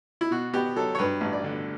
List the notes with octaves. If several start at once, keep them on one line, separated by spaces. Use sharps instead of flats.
E4
B2 F#4
B3 G4
F#3 A4
C#5
G2 B4
A1
D5
D3